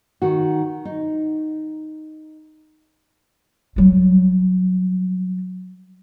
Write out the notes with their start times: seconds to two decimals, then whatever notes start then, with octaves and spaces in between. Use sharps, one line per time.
0.22 D#3 F#4
0.85 D#4
3.76 F#3 G3